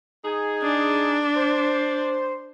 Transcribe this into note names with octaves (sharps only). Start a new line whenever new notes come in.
D#4 G#4
D4
C5